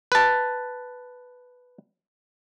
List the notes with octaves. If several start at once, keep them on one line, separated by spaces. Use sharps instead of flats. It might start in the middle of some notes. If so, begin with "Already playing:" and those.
B4 A5